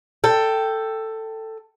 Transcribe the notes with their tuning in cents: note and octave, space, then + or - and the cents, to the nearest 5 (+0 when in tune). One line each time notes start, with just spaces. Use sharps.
A4 +10 G5 +0